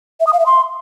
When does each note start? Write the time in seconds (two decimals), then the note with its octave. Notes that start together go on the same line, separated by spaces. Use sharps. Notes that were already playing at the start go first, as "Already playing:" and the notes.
0.20 E5
0.27 D#6
0.33 F5
0.40 E5
0.46 C6